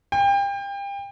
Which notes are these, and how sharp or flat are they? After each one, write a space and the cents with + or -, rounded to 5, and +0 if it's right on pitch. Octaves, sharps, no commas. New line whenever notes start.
G5 +30